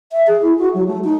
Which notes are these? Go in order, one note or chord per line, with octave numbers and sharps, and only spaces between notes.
E5
G#4
E4
F#4
F#3
A3
D#4